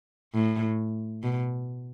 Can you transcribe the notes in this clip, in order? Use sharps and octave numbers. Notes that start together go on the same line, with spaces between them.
A2
B2